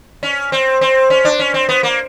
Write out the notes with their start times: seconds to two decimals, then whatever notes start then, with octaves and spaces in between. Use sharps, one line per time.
0.23 C#4
0.52 C4
0.81 C4
1.10 C#4
1.25 D4
1.39 C#4
1.54 C4
1.69 B3
1.83 A#3